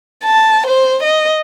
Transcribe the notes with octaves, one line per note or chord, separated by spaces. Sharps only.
A5
C5
D#5